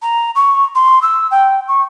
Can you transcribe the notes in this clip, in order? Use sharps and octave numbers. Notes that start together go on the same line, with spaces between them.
A#5
C#6
C6
E6
G5
C#6